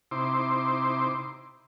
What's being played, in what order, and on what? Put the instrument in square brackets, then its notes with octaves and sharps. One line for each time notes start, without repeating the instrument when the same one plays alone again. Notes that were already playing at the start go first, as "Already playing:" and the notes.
[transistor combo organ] C3 D#4 E4 C5 C6 D6